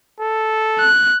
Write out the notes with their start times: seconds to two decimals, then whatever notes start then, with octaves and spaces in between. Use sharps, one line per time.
0.20 A4
0.79 F#6